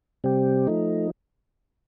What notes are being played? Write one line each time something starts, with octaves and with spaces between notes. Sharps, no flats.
C3 G3 C4 G4
F3 A3 D#4